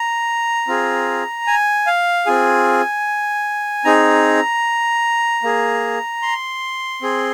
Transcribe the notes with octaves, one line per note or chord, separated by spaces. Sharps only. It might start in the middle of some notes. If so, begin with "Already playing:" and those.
Already playing: A#5
C4 F4 G#4
G#5
F5
C4 F4 G#4 G#5
C4 D#4 G#4 A#5
A#3 G#4
C6
C4 G#4